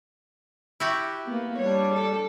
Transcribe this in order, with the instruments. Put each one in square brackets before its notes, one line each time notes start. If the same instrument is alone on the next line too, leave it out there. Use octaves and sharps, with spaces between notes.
[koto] E4 F#4 G4
[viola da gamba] A#3 B3
[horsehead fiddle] G3 D4 [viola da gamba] C#5
[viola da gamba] A4